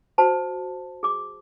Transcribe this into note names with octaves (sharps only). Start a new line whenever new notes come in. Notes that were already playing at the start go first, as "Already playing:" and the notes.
F#4 C5 A5
G#4 D6